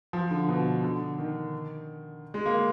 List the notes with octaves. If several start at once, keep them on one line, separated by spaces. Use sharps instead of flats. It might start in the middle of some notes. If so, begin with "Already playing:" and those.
F3
D3
B2
D3
D#3
G#3
A#3